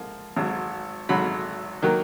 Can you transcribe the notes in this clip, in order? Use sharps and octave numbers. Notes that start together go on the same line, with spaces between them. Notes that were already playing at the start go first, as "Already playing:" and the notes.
Already playing: G#2 F3 A#3
G#1 G#2 F#3
G#1 G#2 F#3 B5
D#3 F#3 A#3